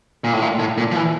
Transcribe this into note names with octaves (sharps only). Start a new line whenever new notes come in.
A#2
A2
A#2
A2
A#2
F3
E3